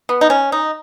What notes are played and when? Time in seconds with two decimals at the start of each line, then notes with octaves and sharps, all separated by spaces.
0.09 B3
0.21 D#4
0.30 C#4
0.52 D#4